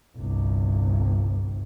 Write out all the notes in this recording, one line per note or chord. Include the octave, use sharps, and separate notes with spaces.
G1 C2